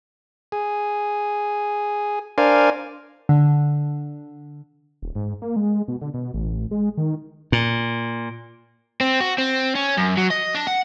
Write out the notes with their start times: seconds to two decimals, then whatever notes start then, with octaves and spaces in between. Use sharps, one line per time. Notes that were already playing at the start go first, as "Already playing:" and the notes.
0.52 G#4
2.38 D4 A#4 C5 D5 F5 G#5
3.29 D3
5.02 D#1
5.15 G#2
5.42 A#3
5.56 G#3
5.88 B2
6.01 D3
6.14 B2
6.34 A1
6.71 G#3
6.97 D#3
7.52 A#2
9.01 C4
9.21 F#4
9.39 C4
9.76 C#4
9.97 F#2
10.18 F#3
10.31 D#5
10.55 D4
10.67 F#5